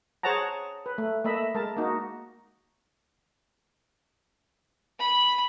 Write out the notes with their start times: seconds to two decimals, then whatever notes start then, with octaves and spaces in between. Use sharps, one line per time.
0.23 G#4 C5 C#5 F#5 A5 A#5
0.86 B4
0.98 A3
1.24 A3 A#3 D#5 E5 B5
1.54 G#3 A#4 A5
1.77 A#3 D#4 F#4
5.00 B5